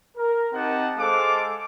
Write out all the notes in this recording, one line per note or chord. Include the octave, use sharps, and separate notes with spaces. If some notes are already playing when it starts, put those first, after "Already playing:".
A#4
C4 D#4 G4 F#5 A5
G#3 A4 C5 F5 D6